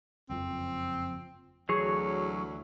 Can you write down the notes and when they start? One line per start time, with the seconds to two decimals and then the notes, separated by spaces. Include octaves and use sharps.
0.29 F#1 F2 F3 C4
1.69 D2 E3 F#3 G#4 C#5